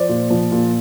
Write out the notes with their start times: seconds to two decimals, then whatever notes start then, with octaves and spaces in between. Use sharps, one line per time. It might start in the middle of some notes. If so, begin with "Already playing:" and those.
Already playing: F3 C5 D5
0.09 A#2
0.30 F3
0.52 A#2